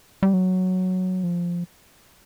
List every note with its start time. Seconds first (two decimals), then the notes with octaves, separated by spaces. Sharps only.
0.23 G3
0.33 F#3
1.23 F3